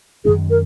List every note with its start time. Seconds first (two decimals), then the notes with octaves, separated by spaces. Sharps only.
0.25 F#2 D#3 G#3 C#4 G#4
0.50 A#4